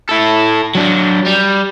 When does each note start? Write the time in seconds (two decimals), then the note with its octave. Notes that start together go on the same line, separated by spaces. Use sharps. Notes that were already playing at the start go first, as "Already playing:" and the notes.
0.09 E4 A4
0.75 F#3 D4
1.26 G3